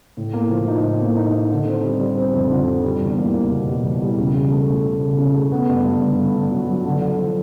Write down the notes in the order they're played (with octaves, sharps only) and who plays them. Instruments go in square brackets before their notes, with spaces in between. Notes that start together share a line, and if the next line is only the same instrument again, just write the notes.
[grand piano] A2
A#3
F3
D#4
A2
A#3
D#4
D#4
D3
C4
G3
G3
C4
F2
D3
G3
G3
E2
A#3
A#3
B2
G3
E2
G3
C#3
C#3
A3
A3
C#3
C#3
C#3
A3
B3
G2
G2
D3
D3
D3
F#3
F#3
D3
D3
F3